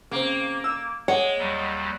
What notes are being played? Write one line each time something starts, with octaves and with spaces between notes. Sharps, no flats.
C#3 A#3 C4
E6
G#3 C#5 F#5
D#2 F#3 G3